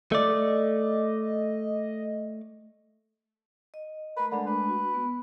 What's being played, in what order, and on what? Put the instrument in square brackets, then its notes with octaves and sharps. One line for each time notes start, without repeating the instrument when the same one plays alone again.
[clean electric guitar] A3 D5 [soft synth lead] D#5
[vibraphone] D#5
[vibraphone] A3 A#4 A#5 [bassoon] B4
[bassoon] D3 [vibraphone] G#3 A3 D4
[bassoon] B4
[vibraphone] F#4
B3